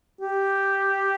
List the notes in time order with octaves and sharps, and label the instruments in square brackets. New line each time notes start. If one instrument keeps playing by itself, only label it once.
[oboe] G4